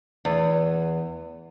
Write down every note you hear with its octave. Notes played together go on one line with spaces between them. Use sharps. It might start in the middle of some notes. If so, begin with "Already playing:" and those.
E2